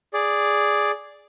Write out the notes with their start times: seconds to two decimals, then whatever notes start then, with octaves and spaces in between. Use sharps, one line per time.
0.13 G#4 D5